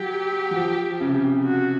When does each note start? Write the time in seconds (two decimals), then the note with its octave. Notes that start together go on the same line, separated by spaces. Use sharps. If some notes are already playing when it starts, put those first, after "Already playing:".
Already playing: F#3 G4
0.51 F#3
0.56 F3
1.00 C#3
1.07 C3
1.15 C#3
1.44 F#4